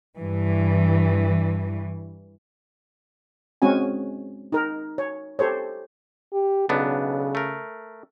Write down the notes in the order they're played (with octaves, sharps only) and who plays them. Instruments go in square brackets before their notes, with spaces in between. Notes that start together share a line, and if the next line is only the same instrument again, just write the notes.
[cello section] G2 E3
[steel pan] G#3 C4 C#4 F#4 G#5
D#4 A#4
C#5
G4 A4 C5 C#5
[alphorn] G4
[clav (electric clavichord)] B1 B3 D4 [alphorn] C#3
[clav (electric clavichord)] A3 A#4